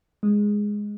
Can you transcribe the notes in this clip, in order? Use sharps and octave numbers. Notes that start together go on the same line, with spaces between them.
G#3